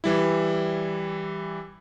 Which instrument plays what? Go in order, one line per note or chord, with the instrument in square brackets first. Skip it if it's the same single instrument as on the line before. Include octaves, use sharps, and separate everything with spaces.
[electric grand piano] E3 G3 E4